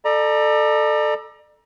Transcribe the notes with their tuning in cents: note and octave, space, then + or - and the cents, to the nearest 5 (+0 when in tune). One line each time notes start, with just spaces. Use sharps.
A4 +0 D5 +35 A#5 +25